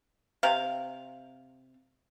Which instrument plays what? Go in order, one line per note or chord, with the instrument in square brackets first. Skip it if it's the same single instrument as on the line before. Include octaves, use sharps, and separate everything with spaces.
[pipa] C3 F5